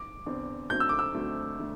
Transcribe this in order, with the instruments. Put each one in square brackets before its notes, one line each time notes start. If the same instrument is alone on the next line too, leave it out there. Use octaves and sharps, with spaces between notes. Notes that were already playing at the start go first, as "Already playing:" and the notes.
Already playing: [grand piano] D6
[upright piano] E2 D3 C4
[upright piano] D2 D3 A3 C4 [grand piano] G6
[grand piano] E6
D6
E6
[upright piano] D2 D3 A3 C4
D3 A3